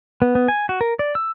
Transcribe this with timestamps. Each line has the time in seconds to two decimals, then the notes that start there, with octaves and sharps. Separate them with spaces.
0.22 B3
0.35 B3
0.48 G#5
0.69 F#4
0.81 A#4
0.99 D5
1.15 E6